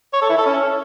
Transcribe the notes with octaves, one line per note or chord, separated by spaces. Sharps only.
C#5
A4
E4
A4
C#4